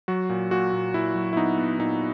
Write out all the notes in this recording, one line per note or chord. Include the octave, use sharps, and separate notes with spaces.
F#3 F#4
A#2
A#2 F#4
A#2
A#2 E4
F#3
E4
B3 D#4
B3
A#2 D#4